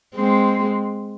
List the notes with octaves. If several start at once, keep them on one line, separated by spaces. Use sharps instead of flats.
G#3 C4